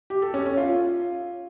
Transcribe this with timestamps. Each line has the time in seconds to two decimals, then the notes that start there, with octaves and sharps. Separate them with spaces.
0.10 G4
0.22 A4
0.34 C#4
0.46 C#4
0.57 F4